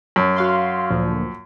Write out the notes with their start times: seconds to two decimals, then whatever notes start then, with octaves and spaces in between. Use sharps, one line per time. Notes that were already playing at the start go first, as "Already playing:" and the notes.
0.16 F#2
0.36 F#4 F5 C6
0.90 D2 A#2 F3